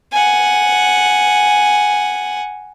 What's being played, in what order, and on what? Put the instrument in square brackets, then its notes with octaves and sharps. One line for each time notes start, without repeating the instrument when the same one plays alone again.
[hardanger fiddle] F#5 G#5